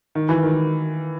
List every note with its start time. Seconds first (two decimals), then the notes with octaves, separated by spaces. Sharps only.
0.15 D#3
0.29 E3
0.43 D#3